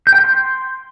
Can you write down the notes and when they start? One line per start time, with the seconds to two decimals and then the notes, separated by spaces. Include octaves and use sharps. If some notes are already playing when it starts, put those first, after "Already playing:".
0.07 G6
0.13 G5
0.18 G6
0.24 C6